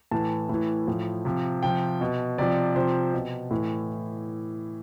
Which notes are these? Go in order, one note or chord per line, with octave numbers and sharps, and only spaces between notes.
A2 E3 A5
A2 E3
A2 F3
C3 F3
C3 F3 G5
B2
C3 F3 D5
C3 F3 C5
B2
A2 E3